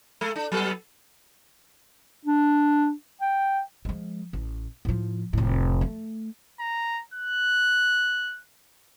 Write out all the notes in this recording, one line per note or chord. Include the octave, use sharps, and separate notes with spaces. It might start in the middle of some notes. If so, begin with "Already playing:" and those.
G#3 A4
D4
F#3 B3 A4
D4
G5
F3 G#3
A1
A2 F3
F1 A2
A3
A#5
F#6